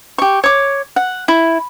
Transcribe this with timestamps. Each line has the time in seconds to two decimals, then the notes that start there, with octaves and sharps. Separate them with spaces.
0.18 G4 C#6
0.44 C#5 D6
0.96 F#5
1.28 E4